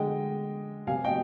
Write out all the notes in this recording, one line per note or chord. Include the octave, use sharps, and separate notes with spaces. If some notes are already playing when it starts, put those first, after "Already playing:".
Already playing: D3 G#3 D#5 G5
C3 G3 F5 G#5
D#5 G5